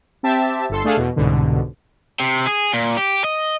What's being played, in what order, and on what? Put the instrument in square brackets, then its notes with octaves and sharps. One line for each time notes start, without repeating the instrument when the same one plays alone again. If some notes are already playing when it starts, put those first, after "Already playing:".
[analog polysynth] C4 G4 E5 A5
G1 A4 C6
A3 D4 G#4 A4 F5
E2 B2
C2 G#2 B2 D3
[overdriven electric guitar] C3
G#4
A#2
G4
D#5